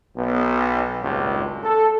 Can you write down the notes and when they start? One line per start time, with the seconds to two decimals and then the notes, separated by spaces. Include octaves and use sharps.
0.16 B1 B3
1.01 G#1 C#2 G2 A#2
1.63 A4